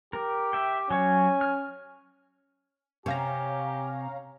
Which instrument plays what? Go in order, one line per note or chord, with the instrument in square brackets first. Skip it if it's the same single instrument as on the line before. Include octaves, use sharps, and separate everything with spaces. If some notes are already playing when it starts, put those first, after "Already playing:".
[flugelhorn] G4 [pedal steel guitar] A#4
[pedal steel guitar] E5 G5
[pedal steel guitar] F#3 C#5 [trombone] C#4 [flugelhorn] G#5
[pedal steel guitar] F6
[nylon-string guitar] C3 [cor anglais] G4 [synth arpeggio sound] C#5 F5 A#5 [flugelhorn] G#5